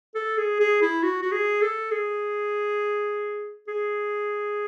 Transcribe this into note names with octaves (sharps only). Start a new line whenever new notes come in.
A4
G#4
G#4
E4
F#4
F#4
G#4
A4
G#4
G#4